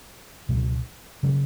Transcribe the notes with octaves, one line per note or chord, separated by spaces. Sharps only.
C#2 B2 F#3
C#3 F#3 C#4